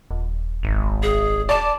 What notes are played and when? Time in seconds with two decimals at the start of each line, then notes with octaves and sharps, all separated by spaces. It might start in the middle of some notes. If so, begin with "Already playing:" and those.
0.11 D#1
0.63 G#1
1.03 G#4
1.49 D5 A5